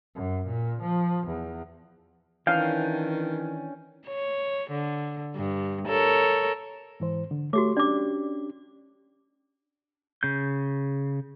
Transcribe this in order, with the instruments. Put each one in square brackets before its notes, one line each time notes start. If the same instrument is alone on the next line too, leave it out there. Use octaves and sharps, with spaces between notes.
[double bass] F#2
A#2
F3
E2
[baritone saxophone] D#3 [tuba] E3 [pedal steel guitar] C#4 D4 G5 [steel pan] F5
[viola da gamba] C#5
D3
G2
A4 A#4 C#5
[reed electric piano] G#2 E3 C5
D3
[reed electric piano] A3 C#5 [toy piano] F#4 G4 D6
[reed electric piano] C#4 D4 G4 [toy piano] D5 D6
[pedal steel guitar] C#3 G6